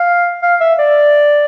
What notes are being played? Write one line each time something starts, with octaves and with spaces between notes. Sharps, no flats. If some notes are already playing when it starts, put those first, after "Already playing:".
Already playing: F5
F5
E5
D5